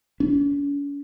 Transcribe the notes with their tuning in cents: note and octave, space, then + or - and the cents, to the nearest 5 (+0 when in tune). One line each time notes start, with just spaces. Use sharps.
C#4 +45